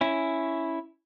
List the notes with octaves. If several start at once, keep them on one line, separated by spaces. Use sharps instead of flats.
C#4 E4